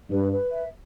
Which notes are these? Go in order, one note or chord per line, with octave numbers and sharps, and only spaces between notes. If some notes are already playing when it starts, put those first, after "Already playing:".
G2 B4
B4
E5